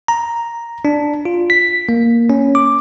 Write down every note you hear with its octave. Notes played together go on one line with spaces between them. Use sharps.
A#5
D4
F4
B6
A#3
C#4
D6